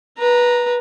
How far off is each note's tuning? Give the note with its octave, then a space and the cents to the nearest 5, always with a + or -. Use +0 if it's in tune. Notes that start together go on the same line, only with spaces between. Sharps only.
B4 -20 A#5 +0